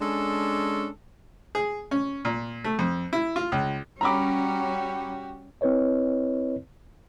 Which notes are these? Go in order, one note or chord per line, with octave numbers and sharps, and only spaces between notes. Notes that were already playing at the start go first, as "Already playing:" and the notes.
G#3 C#4 D4 A4
G#4
C#4
A#2
A3
F2
E4
F4
C#2
G3 C#4 F#4 G4 A#5 B5 D6
C4 E4 B4 C#5 D#5